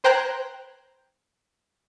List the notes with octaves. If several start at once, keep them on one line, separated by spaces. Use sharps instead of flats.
B4 C5 G5 A#5 F#6 G#6